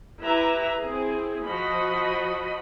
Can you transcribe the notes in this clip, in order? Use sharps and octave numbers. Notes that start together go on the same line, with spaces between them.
E4 G4 B4 E5 A#5
C4 E4 G#4
F3 F#4 D#5 B5